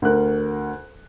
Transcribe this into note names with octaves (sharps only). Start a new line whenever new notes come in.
D2 A#4 F#6